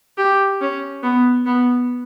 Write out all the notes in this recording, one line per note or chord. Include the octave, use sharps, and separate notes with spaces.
G4
C#4
B3
B3